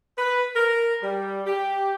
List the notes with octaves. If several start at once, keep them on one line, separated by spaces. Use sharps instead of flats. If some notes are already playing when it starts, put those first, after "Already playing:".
B4
A#4
G3
G4